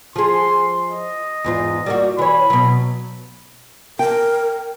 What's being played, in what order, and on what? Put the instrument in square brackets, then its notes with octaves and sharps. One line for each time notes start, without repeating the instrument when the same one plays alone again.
[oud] F3 G#4 [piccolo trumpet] C6
[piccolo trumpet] D#5
[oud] E2 G#2 F4
G3 A#3 F#4
[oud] E3 C#5 [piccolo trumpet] B5
[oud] B2 F#3
[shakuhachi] A#4 [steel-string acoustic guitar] G5